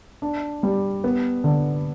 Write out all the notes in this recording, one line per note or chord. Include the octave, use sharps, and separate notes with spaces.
D4
G3
B3
D3